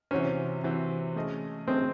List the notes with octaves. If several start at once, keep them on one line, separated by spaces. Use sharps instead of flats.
C3 E3 C4 C#4 F#4 C5
C3 E3 C4 F#4 C5
A3 C#4 G#4 D#5
A3 C4 C#4 G#4 D#5